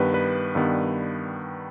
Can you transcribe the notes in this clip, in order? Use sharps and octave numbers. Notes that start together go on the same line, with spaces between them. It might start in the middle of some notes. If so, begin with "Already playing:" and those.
Already playing: G2 D#3 G3 B3 B4
B4
G2 D#3 G3 B3